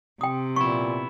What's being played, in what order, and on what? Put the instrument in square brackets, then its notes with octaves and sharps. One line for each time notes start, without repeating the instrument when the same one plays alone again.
[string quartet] C3 [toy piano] G5 D#6
[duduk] A#2 [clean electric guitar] B3 E4 [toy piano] C#6